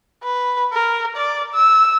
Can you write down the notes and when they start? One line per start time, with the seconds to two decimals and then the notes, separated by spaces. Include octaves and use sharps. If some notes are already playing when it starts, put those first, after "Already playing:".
0.23 B4
0.73 A#4
1.16 D5
1.54 E6